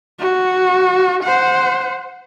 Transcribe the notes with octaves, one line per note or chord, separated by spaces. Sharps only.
F#4
C5 F#5